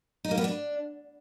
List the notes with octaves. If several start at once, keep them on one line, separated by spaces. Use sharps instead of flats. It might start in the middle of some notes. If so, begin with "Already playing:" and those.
D#4
A#3
B3
D4